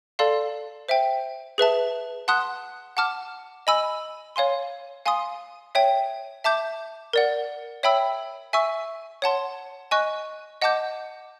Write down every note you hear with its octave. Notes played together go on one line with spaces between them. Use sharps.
A4 D5 F5 A5 C6
C5 E5 G5
G#4 B4 E5 A5
F#5 A5 C6 D#6 F#6
F#5 A5 D6 F6
D#5 G#5 B5 E6
C#5 F5 G#5 C6
F5 G#5 C6 D#6
C#5 E5 G5
E5 A5 D6 G6
A#4 D5 F#5
C#5 E5 G5 B5 E6
E5 G#5 C#6 E6
C#5 F#5 A5 C6
D#5 G#5 C#6 F#6
D#5 F#5 A5 D6 G6